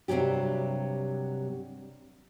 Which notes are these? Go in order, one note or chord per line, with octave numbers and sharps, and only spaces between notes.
G2 C3 E3 F#3 G4